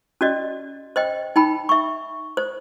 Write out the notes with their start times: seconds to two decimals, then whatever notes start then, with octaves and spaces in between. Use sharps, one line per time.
0.21 C#4 F#4 D5 D#5
0.96 C5 D#5 G5
1.36 D#4 G5 B5
1.69 E5 C#6
2.37 C5